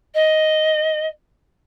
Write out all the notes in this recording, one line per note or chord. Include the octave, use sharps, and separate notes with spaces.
D#5